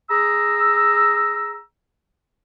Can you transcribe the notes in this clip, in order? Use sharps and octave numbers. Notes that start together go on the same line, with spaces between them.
G#4 A#5 E6